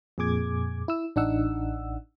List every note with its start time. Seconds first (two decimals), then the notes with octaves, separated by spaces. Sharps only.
0.18 F2 A#2 G#4 D6 G#6
0.88 E4 E6
1.16 A1 D4 D#4 F#5 E6